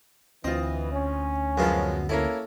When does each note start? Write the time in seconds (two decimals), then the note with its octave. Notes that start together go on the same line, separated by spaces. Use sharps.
0.44 D2 E3 C4 F4 D#5
0.92 C#4
1.57 F#2 F3 G#3 B3 F5
2.09 A#3 C#4 E4 A4